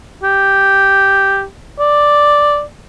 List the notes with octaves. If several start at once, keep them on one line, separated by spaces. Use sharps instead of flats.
G4
D5